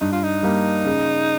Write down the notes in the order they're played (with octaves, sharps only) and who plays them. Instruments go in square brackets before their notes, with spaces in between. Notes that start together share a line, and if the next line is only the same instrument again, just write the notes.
[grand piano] G2 [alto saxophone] D#4
[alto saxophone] F4
D#4
[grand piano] G3 A#3
C#3